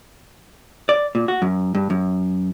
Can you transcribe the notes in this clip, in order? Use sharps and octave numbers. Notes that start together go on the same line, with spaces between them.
D5
A#2
F#4
F#2
G2
F#2